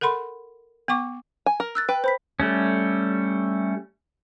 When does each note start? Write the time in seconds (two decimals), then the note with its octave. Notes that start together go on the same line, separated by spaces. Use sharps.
0.01 A4 A#4 F#5 B5 C6
0.88 B3 F#5 C#6 D6
1.46 G#5
1.60 A#4
1.75 E6 F#6 A6
1.89 B4 G5
2.04 C5 B5 B6
2.40 G3 A3 C#4